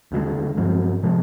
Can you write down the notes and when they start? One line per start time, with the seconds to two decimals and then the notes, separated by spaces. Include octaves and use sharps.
0.12 D#2 D3 F3 G#3
0.57 G2 F3 C4
1.03 C3 F3 G#3